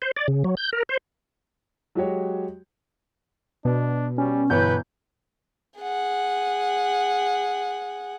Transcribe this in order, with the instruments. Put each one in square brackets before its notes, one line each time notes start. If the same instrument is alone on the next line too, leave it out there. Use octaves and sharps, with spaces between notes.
[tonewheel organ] C5
D5
C#3
F#3
G6
A#4
C5
[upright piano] F#3 G#3 F#4 G4 C#5
[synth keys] B2 [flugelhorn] D4
[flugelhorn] G3 [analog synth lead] C#4
[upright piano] G1 E3 C#5 [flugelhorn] B4 [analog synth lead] G6
[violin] G#4 F#5